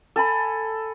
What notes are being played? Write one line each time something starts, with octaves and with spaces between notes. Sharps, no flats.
A4 G#5 B5